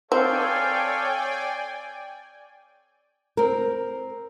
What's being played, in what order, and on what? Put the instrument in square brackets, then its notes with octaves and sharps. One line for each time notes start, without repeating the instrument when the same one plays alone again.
[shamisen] C4 [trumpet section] A4 C#5 [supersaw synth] D5 G5 G#5 [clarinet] F5
[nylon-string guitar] C4 A#4